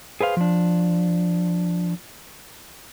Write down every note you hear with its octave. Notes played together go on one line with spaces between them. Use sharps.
G#4 B4 C5 F5
F3 D4